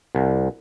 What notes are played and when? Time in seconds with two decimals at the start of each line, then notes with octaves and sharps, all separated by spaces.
0.15 C2